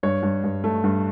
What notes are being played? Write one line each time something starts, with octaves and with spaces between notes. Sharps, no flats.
G2 C#5
G2
G2
A3
G2